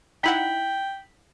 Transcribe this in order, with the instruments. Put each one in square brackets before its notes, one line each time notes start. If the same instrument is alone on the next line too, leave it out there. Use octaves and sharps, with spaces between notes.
[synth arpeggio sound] D#4 E4 F#5 [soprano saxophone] G5 [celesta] B6 F#7